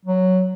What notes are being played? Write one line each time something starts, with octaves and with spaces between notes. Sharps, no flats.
F#3